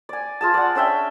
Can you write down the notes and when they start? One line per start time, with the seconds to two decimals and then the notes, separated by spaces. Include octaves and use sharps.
0.09 D5 G#5
0.41 F4 G#4 A5
0.54 D5 F#5
0.75 C#4 D4 E5 G5